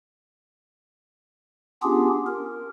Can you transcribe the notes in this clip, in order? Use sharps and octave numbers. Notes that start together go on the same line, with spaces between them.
B3 C#4 D4 F4 G4 G#4
A#4